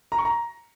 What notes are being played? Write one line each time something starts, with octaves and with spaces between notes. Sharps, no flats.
A#5
C#6
A#5